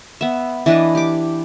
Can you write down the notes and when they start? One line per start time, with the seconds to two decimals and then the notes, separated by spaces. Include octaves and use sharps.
0.21 B3 E5
0.66 E3 D4 B4 D#5
0.95 G4 D6